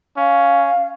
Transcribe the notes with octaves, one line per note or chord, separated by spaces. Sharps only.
C#4 F5